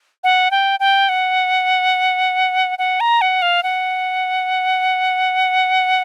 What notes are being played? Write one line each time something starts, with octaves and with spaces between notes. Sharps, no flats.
F#5
G5
G5
F#5
F#5
A#5
F#5
F5
F#5